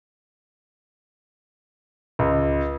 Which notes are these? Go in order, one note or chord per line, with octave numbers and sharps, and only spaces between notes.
C#2